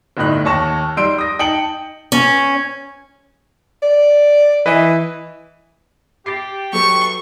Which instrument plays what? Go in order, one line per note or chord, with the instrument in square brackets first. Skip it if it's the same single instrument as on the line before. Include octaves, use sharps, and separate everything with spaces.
[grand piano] G1 A2 D#4 F#6
D#2 C#5 A5 C#6 A#6 E7
G3 D#4 C6 E6 G6 D7
D#6 A#6
D#4 G5 A5 D#6 C#7 F#7
[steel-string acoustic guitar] C#4
[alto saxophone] D5
[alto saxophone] E3 [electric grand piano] B4 D#5
[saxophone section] G4 [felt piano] A6 C7
[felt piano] F#3 A4 B4 [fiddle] C#6